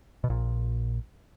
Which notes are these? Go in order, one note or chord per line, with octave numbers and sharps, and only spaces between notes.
B2
A#1 A#2